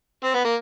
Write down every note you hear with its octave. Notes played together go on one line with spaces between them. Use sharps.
C4
B3
A#3